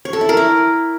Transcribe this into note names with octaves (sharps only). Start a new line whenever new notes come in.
C#5
A4
E4
A#4
E4